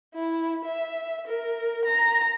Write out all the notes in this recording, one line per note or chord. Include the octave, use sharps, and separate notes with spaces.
E4
E5
A#4
A#5